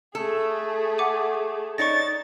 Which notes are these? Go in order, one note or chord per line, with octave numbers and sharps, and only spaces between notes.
A3 G#4 A4
F#5 D6 D#7
D4 D#4 C#5 C#6 A6 A#6